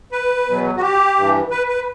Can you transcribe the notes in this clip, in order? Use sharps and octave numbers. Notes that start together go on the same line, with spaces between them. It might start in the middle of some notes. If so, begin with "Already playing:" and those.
B4
E2 B2 F#3
F#4
G4
G2 E3
B4
B4